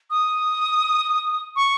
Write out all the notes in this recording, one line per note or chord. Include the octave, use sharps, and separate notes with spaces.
D#6
C#6